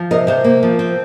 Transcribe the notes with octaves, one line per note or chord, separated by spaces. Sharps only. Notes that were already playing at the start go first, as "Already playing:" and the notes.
Already playing: F3
C3 A#4 D#5
C3 C5 F5
A#3
F3
C4